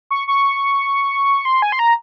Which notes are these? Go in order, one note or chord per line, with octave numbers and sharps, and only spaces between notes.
C#6
C#6
C6
G#5
C6
A#5